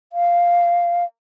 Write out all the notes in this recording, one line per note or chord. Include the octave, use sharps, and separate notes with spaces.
F5